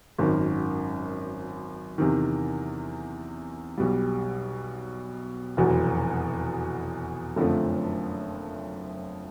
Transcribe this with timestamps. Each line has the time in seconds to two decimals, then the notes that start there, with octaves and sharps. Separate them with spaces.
0.18 G#1 F#2 D#3
1.98 E2 C3 D#3
3.78 B1 B2 G3
5.57 F1 E2 B2 F#3
7.36 F#1 F2 D3 F3 A3